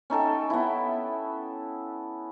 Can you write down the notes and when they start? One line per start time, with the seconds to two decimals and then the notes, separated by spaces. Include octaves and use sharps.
0.10 C#4 D#4 A4 G5
0.50 B3 E4